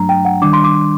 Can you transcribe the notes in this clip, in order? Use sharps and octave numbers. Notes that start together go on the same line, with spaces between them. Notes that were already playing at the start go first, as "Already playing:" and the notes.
Already playing: G2 F#3 A3 D4 A#5
G5
F#5
D#3 G3 D4 D6
C6
D6